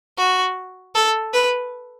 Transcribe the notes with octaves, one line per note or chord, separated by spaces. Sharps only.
F#4
A4
B4